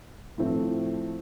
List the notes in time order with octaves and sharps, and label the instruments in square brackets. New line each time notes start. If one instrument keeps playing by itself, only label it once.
[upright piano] A2 F3 A3 C4